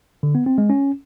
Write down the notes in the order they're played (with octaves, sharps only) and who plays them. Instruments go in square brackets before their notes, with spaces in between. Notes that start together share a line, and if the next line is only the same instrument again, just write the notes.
[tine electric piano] D3
B3
C4
G#3
C#4